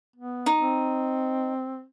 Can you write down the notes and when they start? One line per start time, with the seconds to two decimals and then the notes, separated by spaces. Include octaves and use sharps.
0.16 B3
0.46 D#4
0.59 C4